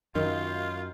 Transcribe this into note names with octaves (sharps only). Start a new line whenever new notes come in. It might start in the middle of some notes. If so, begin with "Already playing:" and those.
F#2 D#3 F4 F5